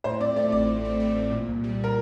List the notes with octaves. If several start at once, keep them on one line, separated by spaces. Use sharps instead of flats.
A2 C5
C4 D5
A3 D5
A1 D5
A2
C4
A3
A1
A#2
C2
G3
A#4